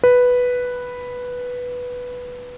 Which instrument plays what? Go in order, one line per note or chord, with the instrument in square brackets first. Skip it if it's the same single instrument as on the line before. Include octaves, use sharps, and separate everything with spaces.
[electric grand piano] B4